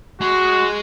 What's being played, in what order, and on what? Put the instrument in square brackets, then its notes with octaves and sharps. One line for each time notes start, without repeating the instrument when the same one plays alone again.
[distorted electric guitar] G#3 [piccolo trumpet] F#4